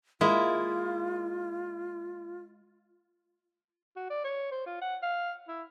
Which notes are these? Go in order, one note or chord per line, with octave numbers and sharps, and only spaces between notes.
G#3 A#3 E4 F4
F#4
D5
C#5
C5
F4
F#5
F5
E4